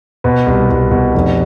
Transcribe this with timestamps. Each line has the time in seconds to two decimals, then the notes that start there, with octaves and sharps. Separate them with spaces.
0.24 B2 B4
0.47 C2
0.70 C2
0.91 B2
1.14 F1